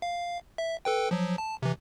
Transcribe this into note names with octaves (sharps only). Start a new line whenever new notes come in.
F5
E5
A4 B4 G5
F3 F#3
A5
C3 E3